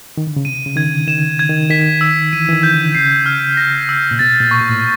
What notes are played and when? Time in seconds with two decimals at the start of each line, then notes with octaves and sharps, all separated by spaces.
0.17 D#3
0.27 D3
0.36 C#3
0.45 C3 D#7
0.66 C#3
0.76 D#3 G#6
0.87 D3
1.07 D#3 E7
1.39 G#6
1.49 D#3
1.70 D#3 B6
2.01 E6
2.33 E3 D#7
2.49 E3
2.53 D#3
2.63 G6
2.74 D3
2.95 C#3 C7
3.26 F6
3.57 A#6
3.89 E6
4.11 A#2
4.19 B2 A6
4.40 A#2
4.51 C#6
4.61 A#2
4.69 A2